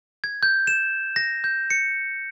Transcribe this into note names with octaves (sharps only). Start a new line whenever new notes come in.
G#6
G6
E7
A#6
G6
C#7